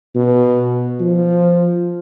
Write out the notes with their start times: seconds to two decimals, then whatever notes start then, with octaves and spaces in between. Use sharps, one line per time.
0.15 B2
1.00 F3